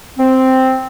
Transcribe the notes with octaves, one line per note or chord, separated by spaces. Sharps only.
C4